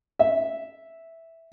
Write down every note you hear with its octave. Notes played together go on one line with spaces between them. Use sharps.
E5